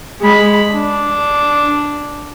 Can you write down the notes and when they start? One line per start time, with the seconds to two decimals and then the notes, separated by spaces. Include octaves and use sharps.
0.21 G#3 B5
0.73 D4